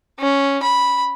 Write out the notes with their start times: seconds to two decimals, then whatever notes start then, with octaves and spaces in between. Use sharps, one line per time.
0.20 C#4
0.63 B5